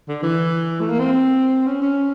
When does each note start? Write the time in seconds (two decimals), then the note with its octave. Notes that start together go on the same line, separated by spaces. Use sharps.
0.08 D3
0.23 E3
0.80 A3
0.90 A#3
0.99 C4
1.66 C#4
1.82 C#4